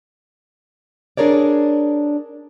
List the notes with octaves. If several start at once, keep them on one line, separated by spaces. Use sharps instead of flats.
D4 G#4 A#4 C#5 D5